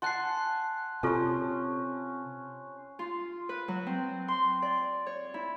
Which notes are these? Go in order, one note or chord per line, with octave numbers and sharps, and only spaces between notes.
F#5 G#5 A5 C6 F#6 C7
C3 C#4 F4 A4 C5 A5
F4
B4
F#3
C4
C6
D5
C#5
E4